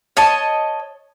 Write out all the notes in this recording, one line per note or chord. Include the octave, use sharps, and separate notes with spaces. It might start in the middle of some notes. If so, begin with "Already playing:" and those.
C#5 D#5 A5